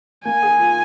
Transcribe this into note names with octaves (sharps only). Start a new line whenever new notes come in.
A#3 G#5
G#4
F4